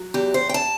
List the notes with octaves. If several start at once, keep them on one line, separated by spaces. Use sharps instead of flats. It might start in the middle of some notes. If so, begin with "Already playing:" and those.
Already playing: F#3
E2 G4
C5
G5
A5